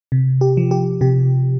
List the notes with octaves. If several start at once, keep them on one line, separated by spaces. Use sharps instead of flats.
C3
G4
F3
G4
C3 G4